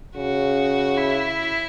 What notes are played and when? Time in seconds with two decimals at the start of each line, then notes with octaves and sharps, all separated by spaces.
0.16 C#3 F#4
0.97 E4